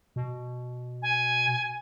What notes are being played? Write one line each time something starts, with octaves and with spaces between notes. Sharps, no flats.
B2
G#5